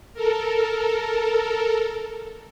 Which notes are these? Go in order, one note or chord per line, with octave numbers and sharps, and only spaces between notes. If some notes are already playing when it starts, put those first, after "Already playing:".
A4 A#4